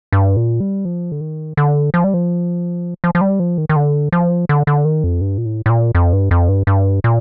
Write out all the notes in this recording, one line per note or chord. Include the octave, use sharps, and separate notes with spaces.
G2
A#2
G3
F3
D3
D#3
D3
F3
G3
F3
F3
F3
G3
F3
D#3
D#3
D3
F3
D3
D3
D#3
F2
G2
A#2
A2
A2
A#2
F2
G2
F2
G2
G2
A#2